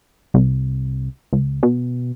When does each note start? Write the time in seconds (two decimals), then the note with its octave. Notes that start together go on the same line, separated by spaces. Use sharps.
0.34 C2
1.33 C#2
1.63 B2